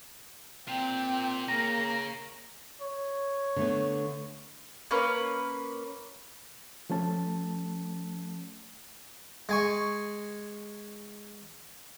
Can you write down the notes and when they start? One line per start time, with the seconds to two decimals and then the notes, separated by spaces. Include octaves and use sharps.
0.68 A#2 C4 G5
1.48 C#3 A#3 A#5
2.82 C#5
3.56 D3 A3 B3
4.91 A#3 C#4 B4
6.90 F3 A3 C#4 A5
9.49 G#3 G#5 C#6